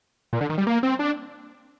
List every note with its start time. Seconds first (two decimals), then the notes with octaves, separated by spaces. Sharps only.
0.33 A#2
0.41 D3
0.50 D#3
0.58 G3
0.67 A#3
0.83 C4
0.99 D4